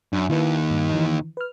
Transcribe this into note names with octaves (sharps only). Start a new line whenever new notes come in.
F#2 D4
D#2 D#3 E4 B4
G2
E3
B4 F6